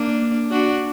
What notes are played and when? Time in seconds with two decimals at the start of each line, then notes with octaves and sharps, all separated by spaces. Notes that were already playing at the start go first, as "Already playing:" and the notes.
Already playing: A#3 D4
0.51 D4 F#4